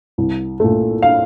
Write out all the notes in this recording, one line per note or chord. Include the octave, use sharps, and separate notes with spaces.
C2
A#2 A3
F5